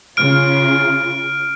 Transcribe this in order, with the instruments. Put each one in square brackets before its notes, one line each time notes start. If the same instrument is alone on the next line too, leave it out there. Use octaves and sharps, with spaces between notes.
[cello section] C#3 F4 [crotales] F6 D7